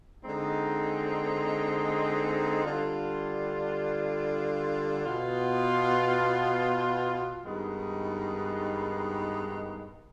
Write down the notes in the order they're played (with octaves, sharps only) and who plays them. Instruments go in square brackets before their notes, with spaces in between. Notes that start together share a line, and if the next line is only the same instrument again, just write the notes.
[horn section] D3 G#3 C4 D#4
D3 G3 D4 F4
B2 B3 F4
G2 D#3 G#3 B3 D#4